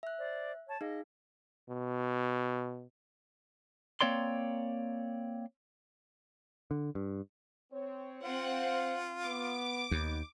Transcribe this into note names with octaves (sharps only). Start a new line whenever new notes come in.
E5 F#6
C5 D5
C#5 A5
D#4 G#4 D#5 F5
B2
A#3 C4 C#5 D5 C6
D3
G2
C4 C#5
C4 F4 C5 F5 F#5
B3 D6
D#2 B3 D#4